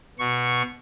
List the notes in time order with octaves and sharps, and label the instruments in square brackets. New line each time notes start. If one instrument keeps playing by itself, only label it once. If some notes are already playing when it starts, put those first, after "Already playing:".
[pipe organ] B2 C#6